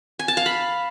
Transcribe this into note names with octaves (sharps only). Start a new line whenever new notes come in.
G#5
A5
F5
B5